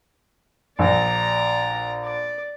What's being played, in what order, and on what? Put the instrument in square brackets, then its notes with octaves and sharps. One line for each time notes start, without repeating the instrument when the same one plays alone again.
[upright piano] A#1 [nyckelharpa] D5 A#5
[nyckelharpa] D5